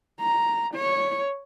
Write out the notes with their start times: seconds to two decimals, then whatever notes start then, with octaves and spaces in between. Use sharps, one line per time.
0.20 A#5
0.74 C#5